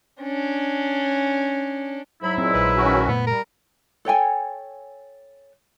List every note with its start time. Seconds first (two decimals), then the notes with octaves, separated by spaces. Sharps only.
0.22 C#4 D4
2.23 G#2 F#3 E4 B5
2.38 A#2 G#3 C4
2.54 A#1 B4
2.76 D#3 C#4 F#4
3.09 F#1 A#2 A3 B3
3.27 G3 A#4
4.05 A4 C#5 G5 G#5